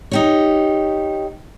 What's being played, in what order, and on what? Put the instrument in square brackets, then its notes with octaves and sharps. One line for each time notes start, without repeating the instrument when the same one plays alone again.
[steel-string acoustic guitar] D#4 G4 C#5